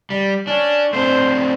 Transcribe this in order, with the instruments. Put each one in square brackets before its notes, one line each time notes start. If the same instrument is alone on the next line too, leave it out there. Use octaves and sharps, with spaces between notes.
[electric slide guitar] G3
[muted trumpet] C#4 [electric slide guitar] D4
[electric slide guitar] A3 C4 D4 [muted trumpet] C5